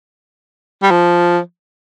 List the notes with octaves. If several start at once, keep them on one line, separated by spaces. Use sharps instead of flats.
G3
F3